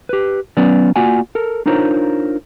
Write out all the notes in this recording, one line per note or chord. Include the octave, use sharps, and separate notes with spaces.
G4 B4
F#3 B3 C#4 B4 D5
A#3 F4 F#4 D5 F#5 G#5
A4 A#4
D4 D#4 F4 A#4 C5 C#5